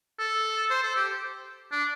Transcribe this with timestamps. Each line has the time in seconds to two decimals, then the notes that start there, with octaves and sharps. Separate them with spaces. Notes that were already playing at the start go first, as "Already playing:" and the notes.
0.19 A4
0.70 C5
0.83 A4
0.96 G4
1.72 D4